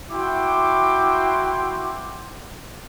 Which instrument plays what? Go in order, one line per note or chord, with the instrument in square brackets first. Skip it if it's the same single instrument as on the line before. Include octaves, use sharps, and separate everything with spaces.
[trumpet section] E4 F#4 G5 C6 D6